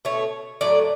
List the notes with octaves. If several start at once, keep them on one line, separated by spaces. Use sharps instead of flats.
B2 A3 C#5
A2 F#3 A3 D5